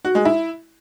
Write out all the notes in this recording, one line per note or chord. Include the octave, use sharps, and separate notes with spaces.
F#4
G#3
E4